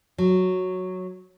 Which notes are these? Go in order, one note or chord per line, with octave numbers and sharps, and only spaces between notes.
F#3